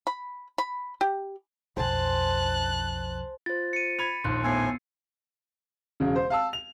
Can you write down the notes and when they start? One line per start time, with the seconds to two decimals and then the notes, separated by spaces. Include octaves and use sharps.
0.07 B5
0.58 B5
1.01 G4
1.77 B1 F2 C5 G#5 A5 F#6
3.46 F4 C5 A6
3.73 C#7 D#7
3.99 B5 G#6 F7
4.24 A#1 D#2 C6 F#6
4.43 A2 F3 B3 G#5 E6 C7
6.00 E1 C#3
6.16 C5
6.30 F5 A5 E6
6.53 F7